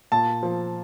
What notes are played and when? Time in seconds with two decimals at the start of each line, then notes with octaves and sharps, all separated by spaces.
0.12 A#2 A5
0.43 F3